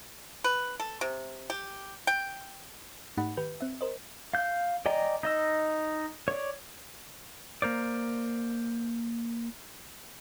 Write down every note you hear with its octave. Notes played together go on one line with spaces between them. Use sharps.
B4
A4
C3
G4
G5
G#2 A3 D#4 G4 F#5 B5
D#3 G4 B4 G6
C4 E5
A#4 C5 D#5
F5 G6
D5 D#5 G5 G#5 A#5
D#4 D#5 E6
C#5 D5
A#3 A#4 C5 D5